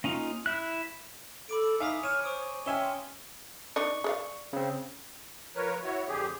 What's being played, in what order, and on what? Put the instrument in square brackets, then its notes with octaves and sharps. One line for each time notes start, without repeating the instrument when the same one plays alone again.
[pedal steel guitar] A#3 C#4 D#4 F4
E4 E5 F#6
[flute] A4 [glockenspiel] B5 D6 D7
[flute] D#4 [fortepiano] E5 F5 D#6 [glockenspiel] G#5 B6
[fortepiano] C#5 [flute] F6 [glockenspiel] D#7 E7
[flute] C5 [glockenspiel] C#6 D#6 D7
[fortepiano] C#4 E5 G#5 [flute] G5 [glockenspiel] F6 E7 G7
[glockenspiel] C6
[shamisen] D4 D#4 D5 [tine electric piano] C#6
[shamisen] G#4 D5 F5
[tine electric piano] C#3 C4
[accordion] F3 A#4 B4 C#5
E4 F#4 C#5
F2 D3 G4 G#4